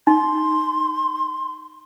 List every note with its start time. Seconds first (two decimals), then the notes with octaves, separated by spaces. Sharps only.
0.07 D#4 C6